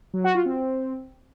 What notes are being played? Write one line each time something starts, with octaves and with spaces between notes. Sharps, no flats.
F#3
F#4
F4
C4